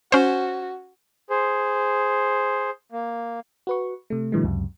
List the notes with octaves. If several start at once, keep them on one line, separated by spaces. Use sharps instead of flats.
C#4 F#4 C5
G#4 C5
A#3
F#4 B4 C#6
C3 A3
A#2 D3 E3 F#3 G#3
C#2 F#2 C3